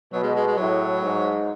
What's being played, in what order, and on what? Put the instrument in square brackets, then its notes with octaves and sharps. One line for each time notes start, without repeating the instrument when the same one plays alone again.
[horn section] B2 [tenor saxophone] F#3
[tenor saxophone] G#3
G#3
G#3
[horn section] A2 [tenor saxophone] F#3
[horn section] G#2